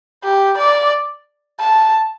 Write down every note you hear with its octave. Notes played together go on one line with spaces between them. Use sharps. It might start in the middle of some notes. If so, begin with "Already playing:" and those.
G4
D5
A5